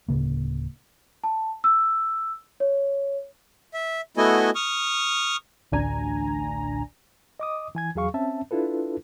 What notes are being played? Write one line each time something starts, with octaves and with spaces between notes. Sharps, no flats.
D1 G#1 C#3 A#3
A5
E6
C#5
E5
A3 B3 E4 F#4 D#5 G#5
C#6 D#6 F6
A1 D2 D4 G#5 A#5
D#5 D6 D#6
E3 G#5 G#6
E2 F#3 G#4 F5 C#6
C4 C#4 E5 A5
D4 E4 F4 A4 B4